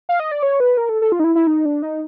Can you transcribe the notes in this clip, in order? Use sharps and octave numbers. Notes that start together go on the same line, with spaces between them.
F5
D#5
D5
C#5
B4
A#4
A4
A4
F4
D#4
E4
E4
D#4
D4
D#4